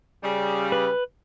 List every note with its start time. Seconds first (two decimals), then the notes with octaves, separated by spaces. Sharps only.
0.23 C#3 G3
0.72 B4